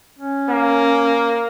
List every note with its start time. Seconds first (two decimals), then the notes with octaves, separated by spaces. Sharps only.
0.19 C#4
0.49 A#3